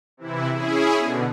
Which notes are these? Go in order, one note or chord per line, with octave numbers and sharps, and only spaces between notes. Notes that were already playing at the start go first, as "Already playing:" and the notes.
C3 E3 E4
C#4 E4 G#4
B2 D3